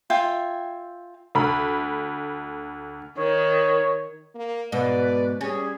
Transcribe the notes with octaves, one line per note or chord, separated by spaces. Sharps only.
F4 E5 G5 G#5
D2 B5
D#3 C#5
A#3
G#2 B2 B4 D5
G3 C#4 G#4